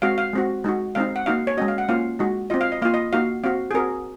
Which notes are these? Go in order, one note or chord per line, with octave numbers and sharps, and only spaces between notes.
G#3 C4 F#4 F5
F5
G#3 C4 F#4
G#3 D#4 F#4
G#3 C4 D#4 F5
F#5
A#3 D#4 F#4 F5
C#5
G#3 C#4 F#4 D#5
F5
F#5
A#3 C#4 F4 F5
G#3 D#4 F#4
C4 F4 D#5
F5
D#5
A#3 F4 F5
D#5
A#3 D#4 F#4 F5
C4 F#4 F5
G#4
C4 F#4 A#4